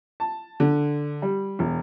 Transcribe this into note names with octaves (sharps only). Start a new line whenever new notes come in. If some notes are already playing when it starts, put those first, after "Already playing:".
A5
D3
G3
E1